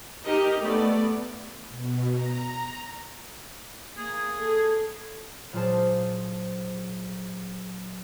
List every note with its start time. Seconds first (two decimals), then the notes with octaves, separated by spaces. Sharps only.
0.24 D#4 G4 A#4 D#5
0.61 A3 B3 D5
1.70 B2
2.10 A#5
3.97 A#3 G#4
4.39 A4
5.53 A#2 F#3 F4 G#4 C5 A5